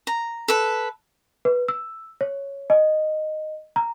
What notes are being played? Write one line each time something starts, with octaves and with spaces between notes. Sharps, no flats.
A#5
A4 B4
B4
E6
C#5
D#5
A#5